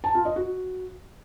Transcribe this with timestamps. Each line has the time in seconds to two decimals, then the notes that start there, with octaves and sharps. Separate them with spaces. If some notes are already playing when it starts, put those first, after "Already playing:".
0.04 A5
0.15 F4
0.25 D#5
0.36 F#4